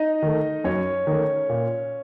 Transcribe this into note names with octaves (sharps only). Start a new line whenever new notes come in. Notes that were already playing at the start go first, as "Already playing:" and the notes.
Already playing: D#4 D#5
D#3 A3
F#2 C#4 C#5
D#3 A3
A#2